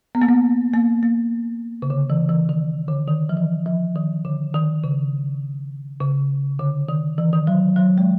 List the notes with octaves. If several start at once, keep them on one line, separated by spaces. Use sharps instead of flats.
B3
A#3
B3
A#3
A#3
C#3
D3
E3
E3
D#3
D3
D#3
F3
E3
F3
D#3
D3
D#3
C#3
C#3
D3
D#3
E3
D#3
F#3
F#3
G#3